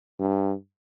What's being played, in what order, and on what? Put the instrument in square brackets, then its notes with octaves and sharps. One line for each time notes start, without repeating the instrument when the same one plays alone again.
[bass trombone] G2